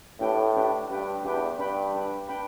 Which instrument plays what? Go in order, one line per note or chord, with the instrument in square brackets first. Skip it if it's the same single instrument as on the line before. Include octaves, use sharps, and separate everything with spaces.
[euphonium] A2 [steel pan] D4 G4 B4 G5
[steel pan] D4 G4 B4 G5
[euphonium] G2 [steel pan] D4 G4 B4 G5
[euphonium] E2 [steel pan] D4 G4 B4 G5
[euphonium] G2 [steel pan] D4 B4 G5 B5
[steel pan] D4 B4 G5 B5
D4 B4 G5 B5